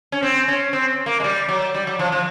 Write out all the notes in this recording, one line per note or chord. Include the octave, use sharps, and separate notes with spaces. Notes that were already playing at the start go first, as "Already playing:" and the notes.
C#4
C4
C#4
C4
A#3
G#3
G3
F#3
G3
F#3
F3
F3